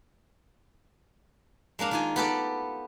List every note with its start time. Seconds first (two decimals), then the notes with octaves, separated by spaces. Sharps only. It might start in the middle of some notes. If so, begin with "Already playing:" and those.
1.79 G#3 A#3 D4 F5
1.91 D#3 F4 G#5
2.16 B3 G4 A4 D5